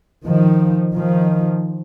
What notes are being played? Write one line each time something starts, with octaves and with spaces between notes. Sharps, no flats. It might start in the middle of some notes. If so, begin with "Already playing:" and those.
D#3 F3
D#3 F3